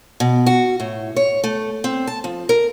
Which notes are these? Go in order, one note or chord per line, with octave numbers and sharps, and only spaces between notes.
B2
F#4
A2
C#5
A3
C4
A5
F3
A#4